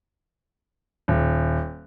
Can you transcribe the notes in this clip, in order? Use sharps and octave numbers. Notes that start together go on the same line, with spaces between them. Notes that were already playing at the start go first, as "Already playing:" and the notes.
D#1